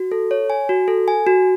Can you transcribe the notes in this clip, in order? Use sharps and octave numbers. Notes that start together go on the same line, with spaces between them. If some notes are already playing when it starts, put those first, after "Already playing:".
Already playing: F#4
A4
C#5
G#5
F#4
A4
G#5
F#4